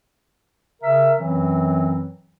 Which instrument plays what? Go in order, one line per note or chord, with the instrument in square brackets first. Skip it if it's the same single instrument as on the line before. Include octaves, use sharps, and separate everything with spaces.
[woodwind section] C#3 A#4 E5
F#2 E3 F#3 C4